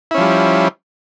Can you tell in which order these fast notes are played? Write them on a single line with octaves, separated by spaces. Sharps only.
E4 C#4 F3 G3